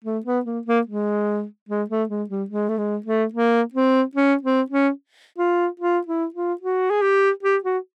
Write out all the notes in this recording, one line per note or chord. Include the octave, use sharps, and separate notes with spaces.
A3
B3
A#3
A#3
G#3
G#3
A3
G#3
G3
G#3
A3
G#3
A3
A#3
C4
C#4
C4
C#4
F4
F4
E4
F4
F#4
G#4
G4
G4
F#4